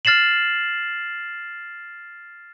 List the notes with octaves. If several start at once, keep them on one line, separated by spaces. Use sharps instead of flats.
F6 A6 C7 E7 F#7